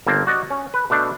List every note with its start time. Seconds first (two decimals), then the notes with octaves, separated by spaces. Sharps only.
0.07 G1 A#3 C4 A5
0.27 F#4 D5 D#5
0.50 C#4
0.74 B4
0.90 B2 A3 D4